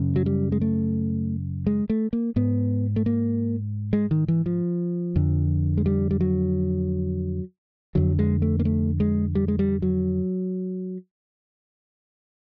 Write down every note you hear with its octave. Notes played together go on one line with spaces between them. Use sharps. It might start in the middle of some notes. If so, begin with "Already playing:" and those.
Already playing: F#2 C#3
F#3
G3
G#3
A3
G#3
A3
A#3
G#2 B3
A3
A#3
G#3
D#3
E3
F3
F2 D3
G#3
G3
G3
F#3
F2 D3 F#3
G#3
A3
A#3
A3
G#3
G3
G#3
G3
F#3